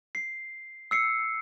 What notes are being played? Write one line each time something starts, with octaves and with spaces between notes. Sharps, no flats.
C7
E6 C7 C#7